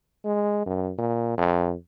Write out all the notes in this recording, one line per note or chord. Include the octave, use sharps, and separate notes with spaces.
G#3
F#2
A#2
F2